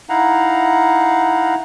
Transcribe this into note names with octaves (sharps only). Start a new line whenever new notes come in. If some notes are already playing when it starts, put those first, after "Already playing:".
D#4 E4 F5 F#5 A#5